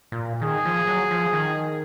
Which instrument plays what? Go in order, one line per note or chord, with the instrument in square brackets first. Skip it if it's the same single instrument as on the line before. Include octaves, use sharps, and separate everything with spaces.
[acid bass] A#2
[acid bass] D#3 [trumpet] G#4
[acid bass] F3
F#3
F3
D#3